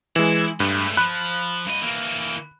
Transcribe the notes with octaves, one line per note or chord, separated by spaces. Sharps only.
E3 G#3 E4
G2 G#3 A3
F3 B5 F#6
G2 D#5
E3 A#3